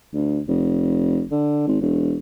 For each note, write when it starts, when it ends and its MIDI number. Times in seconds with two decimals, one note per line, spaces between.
0.14 0.40 38
0.48 1.23 29
1.31 1.64 50
1.67 1.77 32
1.81 2.18 28